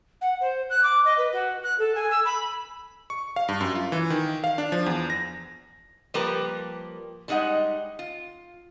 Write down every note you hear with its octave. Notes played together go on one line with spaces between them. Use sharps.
F#5
C5
F#6
D6
D#5
B4
F#4
F#6
A4
G#5
E6
B5
C#6
F5
G2
F#2
F4
E3
D#3
F5
D4
F3
E2
A#6
F3 G3 A#3 G4 A#4 B4
G3 G#3 D#4 D#5 F#5
F4